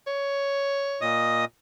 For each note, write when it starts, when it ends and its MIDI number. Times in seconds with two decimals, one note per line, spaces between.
0.07 1.16 73
1.01 1.45 46
1.01 1.45 75
1.01 1.45 87